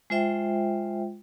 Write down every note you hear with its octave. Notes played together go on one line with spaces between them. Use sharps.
G#3 F4 C5 E5 G5